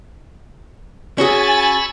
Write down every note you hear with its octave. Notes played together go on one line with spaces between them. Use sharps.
C#4 F#4 G#4 G#5 B5 C#6 E6 A6